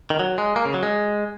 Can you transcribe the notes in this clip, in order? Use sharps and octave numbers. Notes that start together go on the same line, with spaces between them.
D#3
F#3
G#3
A#3
C#3
F#3
G#3